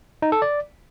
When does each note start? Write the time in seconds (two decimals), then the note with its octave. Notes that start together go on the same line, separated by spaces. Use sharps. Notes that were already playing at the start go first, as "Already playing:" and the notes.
0.22 D#4
0.32 A4
0.42 D5